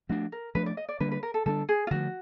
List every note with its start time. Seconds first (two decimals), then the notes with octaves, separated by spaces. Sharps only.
0.09 F3 A3 D4 F#4
0.32 A#4
0.55 F3 A3 D4 B4
0.66 D5
0.77 D#5
0.89 D5
1.00 D3 G3 A#3 D4 B4
1.11 B4
1.23 A#4
1.34 A4
1.46 D3 G3 A#3 D4 A4
1.69 G#4
1.87 F4
1.91 D3 F3 A3 F#4